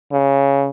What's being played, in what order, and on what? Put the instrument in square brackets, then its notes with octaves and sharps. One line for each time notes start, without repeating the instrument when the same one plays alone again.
[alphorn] C#3